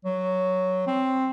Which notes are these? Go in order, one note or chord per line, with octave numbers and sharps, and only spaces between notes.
F#3
C4